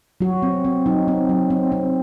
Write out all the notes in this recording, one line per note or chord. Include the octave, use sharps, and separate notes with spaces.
F#3 F#4
C4
C4
F#3 D#4
C4
F#3
C4
C4